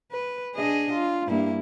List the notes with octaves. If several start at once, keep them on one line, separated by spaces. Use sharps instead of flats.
B4
D4 G#4 D#5
F4
G2 A#3 E4